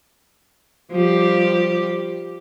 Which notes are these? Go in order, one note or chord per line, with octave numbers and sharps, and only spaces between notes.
F3 G3 G4